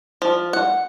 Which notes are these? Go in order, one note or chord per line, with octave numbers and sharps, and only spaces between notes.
F3
F#5